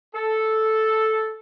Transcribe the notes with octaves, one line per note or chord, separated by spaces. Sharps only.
A4